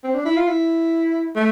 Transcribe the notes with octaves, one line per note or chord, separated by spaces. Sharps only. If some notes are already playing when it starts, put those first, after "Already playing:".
C4
D4
E4
F4
E4
A3